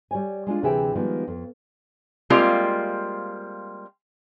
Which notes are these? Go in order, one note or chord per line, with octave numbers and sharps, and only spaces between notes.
G3 C#5 G#5
G#3 D4 F4
D2 C3 E3 G#4 E5 G5
D#3 F3 G3 G#3 B3
F2
G3 G#3 A#3 C4 F4